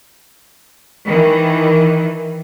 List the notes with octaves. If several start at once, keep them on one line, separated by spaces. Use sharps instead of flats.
D#3 E3